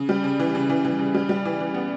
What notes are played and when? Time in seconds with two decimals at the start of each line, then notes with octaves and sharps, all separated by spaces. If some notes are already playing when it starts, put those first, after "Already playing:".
Already playing: C#3
0.09 G3
0.24 C#3
0.39 E3
0.55 C#3
0.70 E3
0.84 E3
0.99 C#3
1.14 G3
1.29 G3
1.45 E3
1.60 E3
1.74 B3